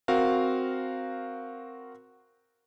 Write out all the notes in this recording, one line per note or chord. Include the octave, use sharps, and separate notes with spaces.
C4 F#4 A#4 F5